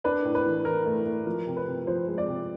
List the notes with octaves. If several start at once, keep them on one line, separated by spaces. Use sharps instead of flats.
D4 B4
A2
B4
E3
E3 A#4
A3
A3
F3 A#4
C3
B4
C3
F3 C5
G#3
D5
C3